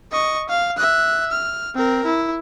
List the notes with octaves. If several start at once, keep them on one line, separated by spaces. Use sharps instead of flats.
D#5 C#6
F5
E5 F#6
F6
C4 A#4
E4